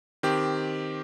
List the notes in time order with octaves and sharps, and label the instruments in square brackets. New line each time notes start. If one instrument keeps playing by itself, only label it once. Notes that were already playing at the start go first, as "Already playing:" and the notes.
[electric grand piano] D#3 C4 G4